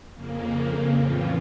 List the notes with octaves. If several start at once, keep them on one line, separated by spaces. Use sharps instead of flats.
F2 C#3 A#3
A2 E3 F3 C4 C#4 F4